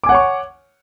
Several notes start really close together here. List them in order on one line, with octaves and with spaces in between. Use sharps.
D6 G#5 F#5 C#5 C#6